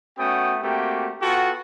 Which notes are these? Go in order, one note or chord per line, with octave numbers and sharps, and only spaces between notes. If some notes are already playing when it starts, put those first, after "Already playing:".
A3 B3 C#4 F#4 G5 D#6
A3 A#3 C4 F#4 G4 G5
B3 F4 F#4 A4 F#5 G5